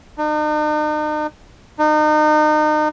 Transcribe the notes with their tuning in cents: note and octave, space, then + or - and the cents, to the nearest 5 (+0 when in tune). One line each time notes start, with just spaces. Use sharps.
D#4 -45
D#4 -35